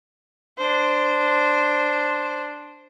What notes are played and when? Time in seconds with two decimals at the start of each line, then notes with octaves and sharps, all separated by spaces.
0.58 D4 C5